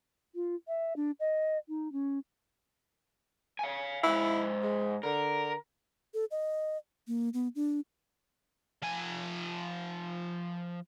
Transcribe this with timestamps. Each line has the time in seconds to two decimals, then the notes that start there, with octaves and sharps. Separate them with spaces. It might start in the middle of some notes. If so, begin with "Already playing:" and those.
0.35 F4
0.68 E5
0.96 D4
1.20 D#5
1.68 D#4
1.92 C#4
3.59 F5 G#5
4.03 G#2 E4 F5
4.63 G#3
5.03 D3 A#4
6.14 A4
6.31 D#5
7.07 A#3
7.34 B3
7.56 D4
8.82 F3 G#5